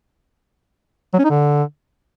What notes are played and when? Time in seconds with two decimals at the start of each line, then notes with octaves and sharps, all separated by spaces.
1.14 F#3
1.19 C#4
1.25 D#4
1.30 D3